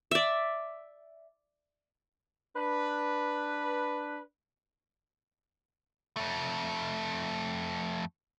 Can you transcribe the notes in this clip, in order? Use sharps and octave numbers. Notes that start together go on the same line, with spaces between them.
D5 E5
D4 B4
F2 A3